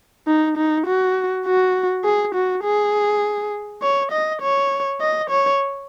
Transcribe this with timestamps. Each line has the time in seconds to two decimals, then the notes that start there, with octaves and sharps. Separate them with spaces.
0.27 D#4
0.57 D#4
0.87 F#4
1.46 F#4
2.04 G#4
2.35 F#4
2.63 G#4
3.82 C#5
4.12 D#5
4.42 C#5
5.01 D#5
5.30 C#5